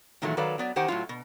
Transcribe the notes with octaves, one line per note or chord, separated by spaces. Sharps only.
A#2 D#3 E3 F#3 G#3 A3
D#3 F#3 A4 B4 D5 F5
F#3 B3 D5
E2 D#3 G4 C5 F#5 G#5
A2 F#3 F4
B2